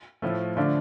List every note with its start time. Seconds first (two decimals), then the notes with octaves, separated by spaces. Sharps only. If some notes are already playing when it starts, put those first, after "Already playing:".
0.22 A2 F3 A3
0.57 D3 F3 A3 D4 F4